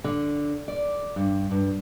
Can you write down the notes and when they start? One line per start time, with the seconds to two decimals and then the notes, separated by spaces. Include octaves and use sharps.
0.04 D3
0.68 D5
1.16 G2
1.51 G2